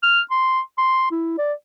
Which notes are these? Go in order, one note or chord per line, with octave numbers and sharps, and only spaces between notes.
F6
C6
C6
E4
D5